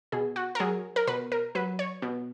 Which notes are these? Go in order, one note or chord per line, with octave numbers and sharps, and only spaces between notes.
B2 G#4
F#4
A#4
F#3 G#4
A#4
B2 B4
A#4
F#3 B4
C#5
B2